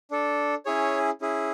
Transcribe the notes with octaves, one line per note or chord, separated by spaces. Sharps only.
D4 A4
C#4 E4 G#4 C#5
C#4 E4 G#4